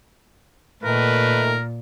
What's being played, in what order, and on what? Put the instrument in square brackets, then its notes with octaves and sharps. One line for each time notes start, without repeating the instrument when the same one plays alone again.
[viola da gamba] A#2 [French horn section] D#3 A3 [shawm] A#4 [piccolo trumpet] B4